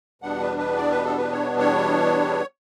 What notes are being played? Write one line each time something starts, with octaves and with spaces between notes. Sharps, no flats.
E2 B2 G3 B3 D4 F#5
B4
B4
D5
B4
A4
B4
C#5
C#5